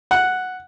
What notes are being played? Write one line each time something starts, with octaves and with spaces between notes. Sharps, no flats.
F#5